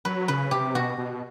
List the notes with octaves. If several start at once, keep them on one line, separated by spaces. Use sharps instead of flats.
F#3 B4
C#3 B4
C3 G4
B2 F#4
B2